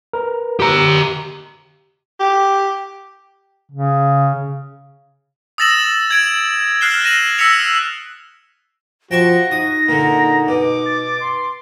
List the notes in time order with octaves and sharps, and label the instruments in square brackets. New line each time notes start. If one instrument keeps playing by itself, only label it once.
[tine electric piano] A#4 B4
[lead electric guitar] G4 A#5
[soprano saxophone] G4
[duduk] C#3
[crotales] D#6 E6 A6 A#6 E7 F#7
G#6 D7
F6 F#6 C7 E7 G7
A#6 D#7 E7 F#7
E6 A#6 B6 C#7 F7
[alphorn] F3 [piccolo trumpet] F#4 [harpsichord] G5 A5 C#6 [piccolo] A#6
[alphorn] D#4 [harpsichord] D#6
[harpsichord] A#2 D3 [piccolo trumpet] A#5
[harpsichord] B2 [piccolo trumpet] D6
[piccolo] A6
C6